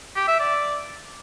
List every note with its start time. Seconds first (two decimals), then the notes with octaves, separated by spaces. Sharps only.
0.16 G4
0.28 E5
0.40 D5